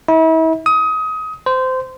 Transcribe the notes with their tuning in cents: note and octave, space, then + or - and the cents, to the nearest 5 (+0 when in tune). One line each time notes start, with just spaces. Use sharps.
E4 -40
D#6 +25
C5 -20